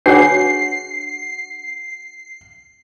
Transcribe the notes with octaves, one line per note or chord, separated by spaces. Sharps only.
D4 F#4 G#4 B4 C#5 F#5 C7